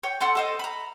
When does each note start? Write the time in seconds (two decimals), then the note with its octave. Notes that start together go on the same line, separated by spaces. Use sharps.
0.03 C#5 G5
0.20 A4 F#5 C6 C#6
0.35 A4 C5 D#5
0.59 A#5 B5